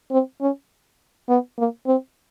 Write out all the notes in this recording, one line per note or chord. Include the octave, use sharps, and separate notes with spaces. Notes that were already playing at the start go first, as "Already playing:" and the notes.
C4
C#4
B3
A#3
C4